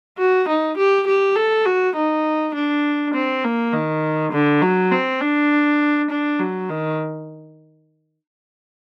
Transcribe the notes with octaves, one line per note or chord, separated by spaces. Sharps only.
F#4
D#4
G4
G4
A4
F#4
D#4
D4
C4
A#3
D#3
D3
F#3
C4
D4
D4
F#3
D#3